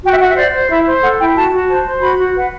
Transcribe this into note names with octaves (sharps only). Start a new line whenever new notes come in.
F#4 G5
E5
F#4 F#5
E5
C5 D5
C5
E4 E5
C5
A4 F#5
E4 G5
F#4 A5
F#4
C5 A5
C5
F#4 B5
F#4
B4 F#5